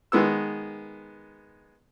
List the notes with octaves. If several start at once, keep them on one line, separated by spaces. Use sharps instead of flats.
D#3 G#3 B3 E6